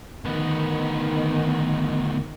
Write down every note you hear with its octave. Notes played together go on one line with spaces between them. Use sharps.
D2 D#3 B3